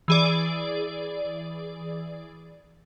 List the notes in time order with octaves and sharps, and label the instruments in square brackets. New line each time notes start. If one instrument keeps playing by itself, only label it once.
[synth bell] E3 G#4 D5